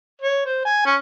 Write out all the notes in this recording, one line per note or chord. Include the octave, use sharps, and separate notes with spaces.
C#5
C5
G#5
C#4